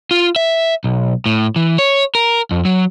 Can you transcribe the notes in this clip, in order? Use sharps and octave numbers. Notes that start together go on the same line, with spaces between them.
F4
E5
B1
A2
E3
C#5
A#4
F2
F#3